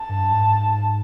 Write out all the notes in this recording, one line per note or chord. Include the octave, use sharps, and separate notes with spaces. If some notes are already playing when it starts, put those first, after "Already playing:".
Already playing: A5
G2
G#2